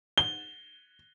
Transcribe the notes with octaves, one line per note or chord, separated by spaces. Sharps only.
G7